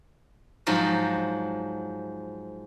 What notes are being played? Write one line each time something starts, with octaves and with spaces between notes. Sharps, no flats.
G#2 F3 F#3